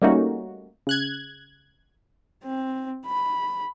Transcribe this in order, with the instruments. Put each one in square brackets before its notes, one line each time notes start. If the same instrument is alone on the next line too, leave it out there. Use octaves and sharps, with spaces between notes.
[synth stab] G3 A3 A#3 C#4 D#4 F#4
C#3 F#6 G#6
[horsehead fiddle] C4
B5